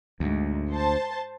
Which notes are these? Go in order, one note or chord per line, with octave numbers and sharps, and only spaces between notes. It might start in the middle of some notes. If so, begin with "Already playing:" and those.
D2 G#2
C5 A5